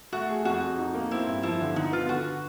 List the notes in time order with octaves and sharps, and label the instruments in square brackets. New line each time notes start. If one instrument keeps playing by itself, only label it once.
[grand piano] A3 [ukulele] F#4
[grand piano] G#4
[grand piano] F2 [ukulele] F#4
[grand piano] F2
D#4
A#3
[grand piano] C4 [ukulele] E4
[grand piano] G2
[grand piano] F3 [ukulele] E4
[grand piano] D3
[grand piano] D3 [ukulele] D#4
[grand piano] B3 [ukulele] F4
[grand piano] D3 [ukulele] F#4